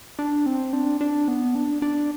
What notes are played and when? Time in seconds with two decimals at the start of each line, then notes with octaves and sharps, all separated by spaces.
0.19 D4
0.46 C4
0.73 D4
1.01 D4
1.28 B3
1.55 D4
1.82 D4